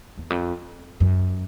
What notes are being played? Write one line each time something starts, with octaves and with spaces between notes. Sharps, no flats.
E2
F2
F#2